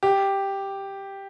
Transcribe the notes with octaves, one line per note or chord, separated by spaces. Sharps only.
G4